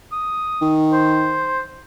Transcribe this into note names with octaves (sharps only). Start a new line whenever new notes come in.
D#6
D#3
C5